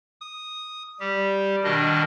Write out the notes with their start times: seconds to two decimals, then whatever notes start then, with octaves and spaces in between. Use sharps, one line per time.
0.21 D#6
1.00 G3 G4
1.64 B2 D#3 D4 D#5